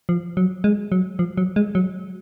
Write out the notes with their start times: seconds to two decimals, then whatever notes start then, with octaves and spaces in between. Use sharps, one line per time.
0.09 F3
0.37 F#3
0.64 G#3
0.92 F#3
1.19 F3
1.37 F#3
1.56 G#3
1.75 F#3